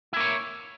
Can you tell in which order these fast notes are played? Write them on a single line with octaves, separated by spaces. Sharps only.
E4 A#3 C#5